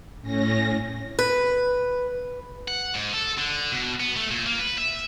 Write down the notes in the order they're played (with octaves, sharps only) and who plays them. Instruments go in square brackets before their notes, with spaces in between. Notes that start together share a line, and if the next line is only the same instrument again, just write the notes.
[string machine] A2 C#4 A#6
[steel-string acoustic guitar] B4
[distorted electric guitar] F#5
G#2
A4
D3
B2
B3
A3
A#2
A#3
B4
E5